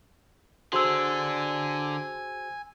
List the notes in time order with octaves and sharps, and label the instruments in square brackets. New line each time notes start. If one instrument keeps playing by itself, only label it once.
[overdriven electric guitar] D3 D4 [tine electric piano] F#4 G#4 C5 [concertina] G#5 [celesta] C6 E6